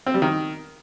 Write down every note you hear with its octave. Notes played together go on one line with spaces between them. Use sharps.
C4
G3
D#3